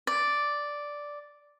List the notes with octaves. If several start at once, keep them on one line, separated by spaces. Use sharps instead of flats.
D5